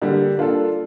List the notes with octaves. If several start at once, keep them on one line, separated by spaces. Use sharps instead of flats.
D3 G3 A#3 D4 G4
A#3 D4 F4 A4